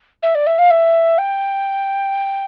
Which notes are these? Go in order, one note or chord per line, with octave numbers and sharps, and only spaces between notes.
E5
D5
E5
F5
E5
G5